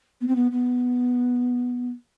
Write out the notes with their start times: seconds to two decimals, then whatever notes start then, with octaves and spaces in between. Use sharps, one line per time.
0.21 B3
0.27 C4
0.35 B3
0.51 B3